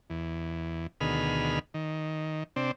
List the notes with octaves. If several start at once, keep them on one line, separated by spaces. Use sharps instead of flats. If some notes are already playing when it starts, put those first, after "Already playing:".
E2
D2 B2 D#3 G#4 B5 F6
D#3
C3 C4 D4